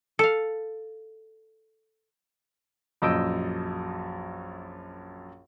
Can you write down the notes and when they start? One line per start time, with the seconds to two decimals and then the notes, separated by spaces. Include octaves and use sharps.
0.19 A4 F5
3.02 A#1 F#2 D#5 E6 G6 D7